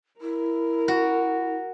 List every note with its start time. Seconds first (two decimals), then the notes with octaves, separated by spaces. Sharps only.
0.21 E4 A#4
0.88 F#4